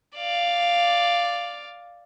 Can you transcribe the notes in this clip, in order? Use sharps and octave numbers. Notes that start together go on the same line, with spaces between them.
D5 F5